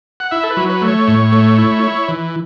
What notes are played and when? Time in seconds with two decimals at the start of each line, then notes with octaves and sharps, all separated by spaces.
0.20 F#5
0.31 E4 E5
0.44 A4
0.51 B4
0.57 F#3
0.69 B4
0.82 A3
0.88 C#5
1.08 A2
1.32 A3
1.58 E4
1.83 E4
2.08 E3